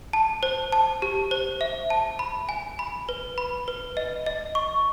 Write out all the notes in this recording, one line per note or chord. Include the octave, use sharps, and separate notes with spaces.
A5
C5
A5
G4
C5
E5
A5
B5
G#5
B5
B4
B5
B4
D#5
D#5
C#6